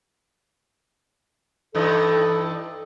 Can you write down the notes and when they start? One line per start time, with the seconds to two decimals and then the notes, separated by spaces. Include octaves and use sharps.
1.75 G2 E3 D#4 A4